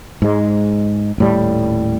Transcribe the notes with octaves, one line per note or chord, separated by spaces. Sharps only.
G#2 G#3
D#1 A2 G3